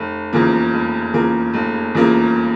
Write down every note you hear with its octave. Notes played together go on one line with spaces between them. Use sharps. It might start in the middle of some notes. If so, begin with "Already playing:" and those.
Already playing: F1
E2 C#3 F3 A#3
F1
E2 C#3 F3 A#3
F1
E2 C#3 F3 A#3